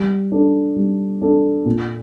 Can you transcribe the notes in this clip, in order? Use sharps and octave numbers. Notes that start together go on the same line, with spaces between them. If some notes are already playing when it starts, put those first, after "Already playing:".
Already playing: G3
D4 A4
G3
D4 A4
A#2